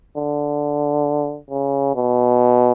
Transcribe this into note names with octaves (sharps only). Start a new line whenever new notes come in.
D3
C#3
B2